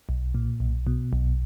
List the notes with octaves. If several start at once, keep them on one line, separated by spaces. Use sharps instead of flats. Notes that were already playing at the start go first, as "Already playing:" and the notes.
B1
A#2
B1
B2
B1